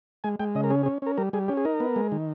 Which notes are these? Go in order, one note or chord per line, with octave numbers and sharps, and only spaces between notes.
G#3 G#5
G#3 G5
C#3 D#5
A#4
C#4 G#4
G#4
C#4
C#4 A#4
G3 A#4
G3 G#4
C#4 G4
G#4
D#4 A#4
B3
G#3
D#3